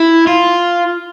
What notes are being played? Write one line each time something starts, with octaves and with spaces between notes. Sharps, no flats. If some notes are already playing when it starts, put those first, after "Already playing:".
Already playing: E4
F4